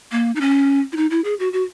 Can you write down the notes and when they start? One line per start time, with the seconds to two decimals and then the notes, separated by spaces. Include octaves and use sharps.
0.12 A#3
0.36 D#4
0.41 C#4
0.92 E4
0.97 D#4
1.11 E4
1.24 G#4
1.40 F#4
1.53 F#4